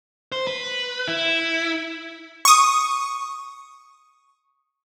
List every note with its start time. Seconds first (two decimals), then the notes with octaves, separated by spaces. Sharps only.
0.32 C5
0.47 B4
1.08 E4
2.45 C#6 D#6